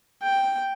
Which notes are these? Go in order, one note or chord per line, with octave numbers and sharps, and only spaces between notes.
G5